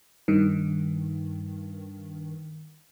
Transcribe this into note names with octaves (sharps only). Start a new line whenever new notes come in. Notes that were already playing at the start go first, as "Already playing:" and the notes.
G2 D#3